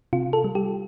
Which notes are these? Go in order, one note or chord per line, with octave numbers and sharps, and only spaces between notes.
C3 F4
A4
G3
G4